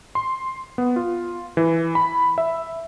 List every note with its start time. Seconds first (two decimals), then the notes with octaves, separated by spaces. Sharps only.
0.15 C6
0.78 B3
0.96 F4
1.57 E3
1.95 B5
2.38 E5